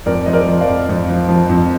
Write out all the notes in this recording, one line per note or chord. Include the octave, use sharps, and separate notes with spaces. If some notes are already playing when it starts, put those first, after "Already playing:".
F2 A#4 D5
F3 D#5
A#4 D5
F3
D5 F5
F2
F2
F3
F3
F2